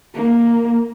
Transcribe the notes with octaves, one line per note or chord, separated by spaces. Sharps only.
A#3